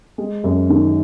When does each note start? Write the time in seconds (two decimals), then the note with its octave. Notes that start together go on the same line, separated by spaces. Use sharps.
0.18 G#3
0.44 F#2
0.70 D#3